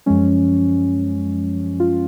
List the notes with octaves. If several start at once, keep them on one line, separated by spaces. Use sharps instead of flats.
F#2 F3 G#3 C#4
F4